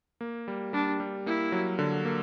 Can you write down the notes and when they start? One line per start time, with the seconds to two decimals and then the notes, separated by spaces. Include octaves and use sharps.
0.21 A#3
0.48 G3
0.73 G3 D4
1.00 G3
1.26 A#3 E4
1.52 F#3
1.79 D3
2.05 A#3